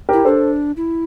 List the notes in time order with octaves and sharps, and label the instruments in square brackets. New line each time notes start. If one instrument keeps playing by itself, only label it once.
[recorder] E4 [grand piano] G4 A#4
[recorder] D4 [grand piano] A4 C5
[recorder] E4